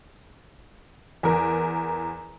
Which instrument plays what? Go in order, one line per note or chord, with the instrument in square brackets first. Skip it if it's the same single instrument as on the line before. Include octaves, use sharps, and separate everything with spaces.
[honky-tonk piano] E2 A#4